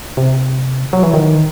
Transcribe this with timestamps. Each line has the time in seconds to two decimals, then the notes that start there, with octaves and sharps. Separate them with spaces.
0.17 C3
0.93 F#3
1.03 E3
1.14 D#3